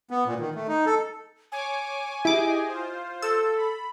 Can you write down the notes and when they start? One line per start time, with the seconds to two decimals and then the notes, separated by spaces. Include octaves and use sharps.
0.11 B3
0.26 A#2
0.40 D#3
0.55 A3
0.68 D#4
0.86 A4
1.52 C#5 G#5 D6
2.25 E4 G4 G#4 D#5 D6
2.67 F4 C5
3.22 A4 E6
3.56 B5